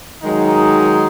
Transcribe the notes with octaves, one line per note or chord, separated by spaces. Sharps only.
D#3 F#3 G#3 D#4